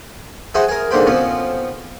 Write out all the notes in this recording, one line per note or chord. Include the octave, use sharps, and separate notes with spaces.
F#4 G#4 C5 D#5 E5
G#4 A#4
G#2 D3 A#3 C5 G5 B5
B2 F3 C4 C#4